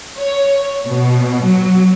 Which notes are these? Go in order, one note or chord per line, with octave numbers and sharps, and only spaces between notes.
C#5
B2
F#3